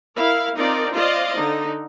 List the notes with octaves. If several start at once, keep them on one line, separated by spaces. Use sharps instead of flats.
E4 A#4 F5
C4 D4 D#4 F4 A#4 D5
F4 C5 D5 D#5 F5
D3 D#4